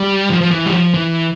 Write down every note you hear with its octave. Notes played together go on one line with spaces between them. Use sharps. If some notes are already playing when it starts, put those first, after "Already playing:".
Already playing: G3
F3
F3
E3
G3
F3
E3